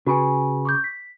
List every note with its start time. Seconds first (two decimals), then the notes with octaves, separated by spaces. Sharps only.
0.07 C#3 F#4 B4 G#5
0.65 C#6 D6 G6
0.84 B6